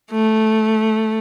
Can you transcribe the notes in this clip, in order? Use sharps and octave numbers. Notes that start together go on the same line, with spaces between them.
A3